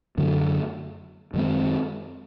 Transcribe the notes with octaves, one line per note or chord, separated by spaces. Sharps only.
F#2 D3 F#3 A3
F#2 D#3 G#3 C4